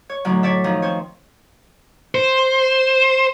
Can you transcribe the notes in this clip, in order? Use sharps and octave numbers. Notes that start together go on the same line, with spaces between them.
C#5
F#2 A2 D3 D#3 F#3
C#5 D5 E5
D#3 F3
C4 C5 C#5
C5